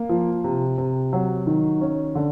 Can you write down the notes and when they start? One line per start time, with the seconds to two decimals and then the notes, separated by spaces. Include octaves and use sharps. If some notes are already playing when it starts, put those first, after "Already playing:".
Already playing: A#3
0.09 F3
0.44 C3
0.78 C3
1.13 F#3
1.47 D#3
1.81 C#4
2.15 D3